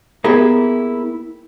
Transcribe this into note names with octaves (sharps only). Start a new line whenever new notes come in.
A#3 B3 E4 G4 G#4 A#4